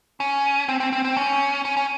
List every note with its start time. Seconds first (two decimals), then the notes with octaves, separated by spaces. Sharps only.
0.20 C#4
0.68 C4
0.80 C4
0.93 C4
1.05 C4
1.17 C#4
1.65 C#4
1.77 C#4